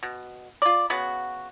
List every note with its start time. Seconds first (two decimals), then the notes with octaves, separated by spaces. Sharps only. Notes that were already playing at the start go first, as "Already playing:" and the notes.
0.03 B2
0.62 F4 D5
0.90 C#3 B3 F#4